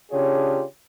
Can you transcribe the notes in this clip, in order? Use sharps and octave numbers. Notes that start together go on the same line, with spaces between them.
C#3 D4 F4 G4 G#4 C#5